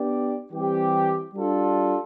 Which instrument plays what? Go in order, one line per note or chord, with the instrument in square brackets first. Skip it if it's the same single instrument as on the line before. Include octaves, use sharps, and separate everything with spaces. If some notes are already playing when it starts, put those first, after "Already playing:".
Already playing: [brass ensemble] B3 D4 G4 D5
E3 G3 C4 G4
G3 D4 F4 A4